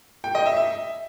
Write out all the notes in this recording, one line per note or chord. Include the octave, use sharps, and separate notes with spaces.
G5
D#5
E5
E5